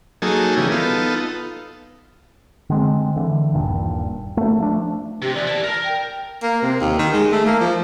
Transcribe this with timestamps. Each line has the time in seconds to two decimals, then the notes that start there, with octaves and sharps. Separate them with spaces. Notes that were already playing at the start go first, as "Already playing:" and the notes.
0.22 F#3 A#3 D#4 G#4 A4
0.57 C#3 E3 G3 A#3
0.72 B3 D#4 F4 A4
2.70 D3 G#3 C4
3.16 D3 E3
3.53 D#1 G2 A#2
4.37 A3
4.58 F3 A3 D4
5.22 C3 G4
5.35 E3 B3 D5
5.47 E4 A5
5.64 A#4
5.85 G5
6.43 A#3
6.62 C3
6.80 D#2
6.99 D#3
7.13 G#3
7.32 A3
7.46 A#3
7.60 F3